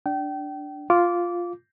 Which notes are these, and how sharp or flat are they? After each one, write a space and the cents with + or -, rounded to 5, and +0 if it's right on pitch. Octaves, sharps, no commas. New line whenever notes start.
D4 +0 G5 -30
F4 +0 D6 -20